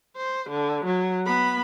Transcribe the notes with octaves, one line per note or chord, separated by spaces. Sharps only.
C5
D3
F#3
B3 B5